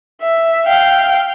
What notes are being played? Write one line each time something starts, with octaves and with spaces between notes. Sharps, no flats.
E5
F5 G5